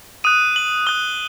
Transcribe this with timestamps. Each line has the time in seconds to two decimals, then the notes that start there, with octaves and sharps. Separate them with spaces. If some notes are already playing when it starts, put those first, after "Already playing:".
0.24 D#6 F#6 D#7
0.56 F#7
0.87 D#6 F#6 G7